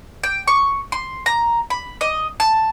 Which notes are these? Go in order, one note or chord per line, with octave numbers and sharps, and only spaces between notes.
G5
C#6
C6
A#5
B5
D#5
A5